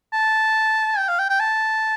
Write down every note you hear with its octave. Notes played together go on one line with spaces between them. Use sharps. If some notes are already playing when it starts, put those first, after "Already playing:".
A5
G5
F5
G5
G5
A5